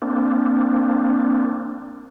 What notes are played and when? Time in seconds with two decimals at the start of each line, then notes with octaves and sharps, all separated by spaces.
0.02 A#3 C4 D4